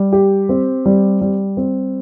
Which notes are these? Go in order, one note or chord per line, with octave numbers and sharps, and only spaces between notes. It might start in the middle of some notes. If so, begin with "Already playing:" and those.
Already playing: G3
G4
C4
G3
G3
C4